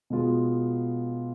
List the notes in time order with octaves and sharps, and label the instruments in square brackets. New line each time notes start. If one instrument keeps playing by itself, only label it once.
[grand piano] B2 G#3 B3 F4